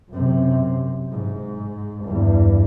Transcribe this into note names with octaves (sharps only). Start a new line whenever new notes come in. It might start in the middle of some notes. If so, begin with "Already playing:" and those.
F#2 C3
G#2
E2 G2